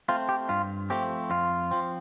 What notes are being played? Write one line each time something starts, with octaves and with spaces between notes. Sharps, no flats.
A3 C4 F4
G4
G2 F4
F3 A3 C4 G4
F2 F4
F3 C4